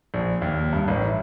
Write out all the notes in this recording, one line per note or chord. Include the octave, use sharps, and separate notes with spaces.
A#1
D#2
G2
A1
E4